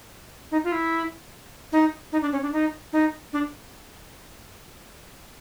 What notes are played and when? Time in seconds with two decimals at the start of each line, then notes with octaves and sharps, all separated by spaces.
0.52 D#4
0.64 F4
0.72 E4
1.72 D#4
2.12 D#4
2.22 D4
2.32 C#4
2.43 D4
2.53 D#4
2.93 D#4
3.33 D4